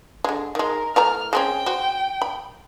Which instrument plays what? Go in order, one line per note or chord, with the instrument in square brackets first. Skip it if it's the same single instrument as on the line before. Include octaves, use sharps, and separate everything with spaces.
[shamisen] D3 G#3
[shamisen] D#3 G#3 [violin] A#4
[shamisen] E3 A3 A#5 [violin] F6
[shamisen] G#3 C4 C#4 [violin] G5
[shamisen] F#4 C5
B5